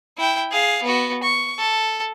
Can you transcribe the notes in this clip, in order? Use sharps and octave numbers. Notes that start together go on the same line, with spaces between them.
E4 G5
G#4 F5
B3 F#4
C#6
A4